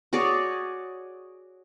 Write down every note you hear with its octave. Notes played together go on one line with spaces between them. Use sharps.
F#4 G#4 C#5 D5